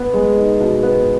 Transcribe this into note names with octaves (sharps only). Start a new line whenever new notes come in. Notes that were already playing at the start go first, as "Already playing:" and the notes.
Already playing: B3
G#3
D#4
B2
B3